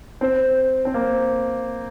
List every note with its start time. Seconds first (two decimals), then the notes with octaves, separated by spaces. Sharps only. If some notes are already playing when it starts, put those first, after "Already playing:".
0.21 C4
0.85 C4
0.94 A#3